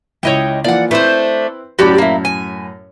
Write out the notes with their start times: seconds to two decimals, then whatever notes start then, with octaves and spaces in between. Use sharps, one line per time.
0.23 C#2 E4 C#5 D#5 G5
0.64 E3 F3 A#3 D5 F#5
0.91 A3 C4 D4 E4 B4 C5
1.79 F#2 A2 F#4 G4 D5 B5
1.98 A#3 E4
2.25 G#5